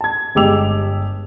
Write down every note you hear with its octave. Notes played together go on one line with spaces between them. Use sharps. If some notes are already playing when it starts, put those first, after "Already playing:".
A5 G#6
G1 G#3 G4 D6 E6 F7